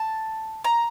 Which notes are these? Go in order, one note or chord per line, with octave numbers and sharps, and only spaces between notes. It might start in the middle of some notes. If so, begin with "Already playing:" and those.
Already playing: A5
A#5